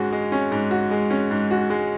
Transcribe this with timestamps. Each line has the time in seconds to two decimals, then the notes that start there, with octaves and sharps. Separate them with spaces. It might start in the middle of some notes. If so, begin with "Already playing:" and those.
Already playing: G#2 G#3 C#4 F#4
0.12 G#3
0.32 C#4
0.52 G#2
0.71 F#4
0.91 G#3
1.11 C#4
1.31 G#2
1.51 F#4
1.70 G#3